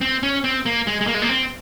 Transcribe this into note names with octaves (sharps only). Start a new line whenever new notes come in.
C4
C#4
C4
A#3
G#3
G#3
A#3
G#3
A#3
C4